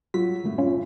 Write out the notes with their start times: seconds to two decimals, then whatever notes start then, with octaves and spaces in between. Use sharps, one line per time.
0.14 F#3 F4 B6
0.44 F#1 A2
0.58 C#4 F4